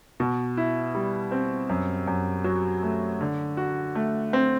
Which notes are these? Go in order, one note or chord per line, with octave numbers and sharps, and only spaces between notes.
B2
E4
G3
C4
F#2
F#2
F#3
A3
D3
F#4
A3
C4